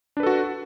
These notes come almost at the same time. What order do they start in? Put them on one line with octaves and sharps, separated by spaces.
D4 B4 A4 F#4